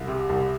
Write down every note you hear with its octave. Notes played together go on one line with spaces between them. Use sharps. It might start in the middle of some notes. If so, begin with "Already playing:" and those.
Already playing: C2
C3
C2